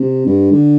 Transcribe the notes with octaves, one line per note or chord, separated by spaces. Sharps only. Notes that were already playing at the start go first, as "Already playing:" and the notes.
Already playing: C3
G2
D3